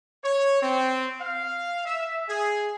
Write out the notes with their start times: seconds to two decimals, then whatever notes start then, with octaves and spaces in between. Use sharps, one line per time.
0.24 C#5
0.62 C4
1.20 F5
1.86 E5
2.29 G#4